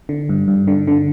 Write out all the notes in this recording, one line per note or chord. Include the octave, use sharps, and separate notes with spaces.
D3
G2
G2
D3
D3